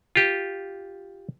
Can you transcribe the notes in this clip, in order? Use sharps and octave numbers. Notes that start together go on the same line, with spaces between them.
F4 G4